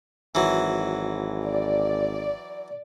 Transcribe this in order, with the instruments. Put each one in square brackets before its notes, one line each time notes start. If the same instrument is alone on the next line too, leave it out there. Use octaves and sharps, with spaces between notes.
[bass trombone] G#1 [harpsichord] E3 F#3
[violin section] D5